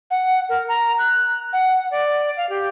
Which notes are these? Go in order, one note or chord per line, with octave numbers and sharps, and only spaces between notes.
F#5
A#4
A#5
F#6
F#5
D5
F5
G4